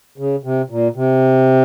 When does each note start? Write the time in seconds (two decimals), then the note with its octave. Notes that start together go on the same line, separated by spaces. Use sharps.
0.18 C#3
0.44 C3
0.70 A#2
0.96 C3